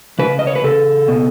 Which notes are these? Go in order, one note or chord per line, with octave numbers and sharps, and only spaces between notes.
C#3 B4
D#5
C#5
B4
C#3 A4
B2